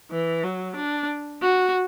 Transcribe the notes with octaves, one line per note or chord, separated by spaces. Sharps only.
E3
F#3
D4
F#4